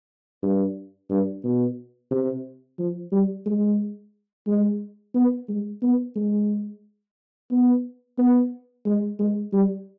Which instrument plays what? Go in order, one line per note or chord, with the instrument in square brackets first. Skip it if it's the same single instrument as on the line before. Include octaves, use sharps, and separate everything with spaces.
[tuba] G2
G2
B2
C3
F3
G3
G#3
G#3
B3
G#3
B3
G#3
B3
B3
G#3
G#3
G3